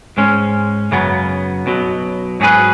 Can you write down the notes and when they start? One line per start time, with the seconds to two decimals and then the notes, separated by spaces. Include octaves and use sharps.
0.17 G#2 G#3 C#4
0.92 F#2 C#3 F#3 B3
1.66 B1 B2 F#3
2.40 G#2 F#3 C#4 G#4 B4